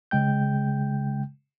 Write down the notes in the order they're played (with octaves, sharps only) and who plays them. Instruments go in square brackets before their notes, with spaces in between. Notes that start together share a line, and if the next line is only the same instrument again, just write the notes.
[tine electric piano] C#3 G#3 G5 G6